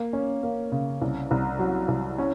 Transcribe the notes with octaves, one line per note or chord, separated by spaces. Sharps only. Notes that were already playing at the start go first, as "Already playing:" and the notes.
Already playing: A#3
C#4
A#3
C#3
C2
C2
F#3
C2
C#4